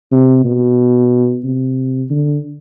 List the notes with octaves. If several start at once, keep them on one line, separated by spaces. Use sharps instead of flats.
C3
B2
C3
D3